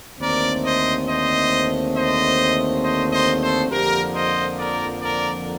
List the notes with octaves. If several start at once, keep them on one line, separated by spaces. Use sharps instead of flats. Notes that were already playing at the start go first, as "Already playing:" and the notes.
D#2 D3 A3 C4 A#4 D5
C5 D#5
C5 D#5
C5 D#5
C5 D#5
C5 D#5
A4 C5
F2 D3 F3 A#3 G4 A#4
C5 D#5
A#4 D5
A#4 D5